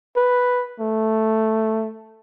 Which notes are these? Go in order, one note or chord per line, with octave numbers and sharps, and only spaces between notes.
B4
A3